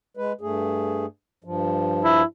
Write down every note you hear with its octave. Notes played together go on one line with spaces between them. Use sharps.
G#3 B4
G2 A3 G#4
G2 F3
E4